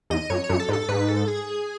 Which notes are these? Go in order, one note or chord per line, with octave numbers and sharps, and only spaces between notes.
E2 D#5
F#2 C#5
C#5
F#2
A4
G#2
A4
G#2 B4
A4
G#4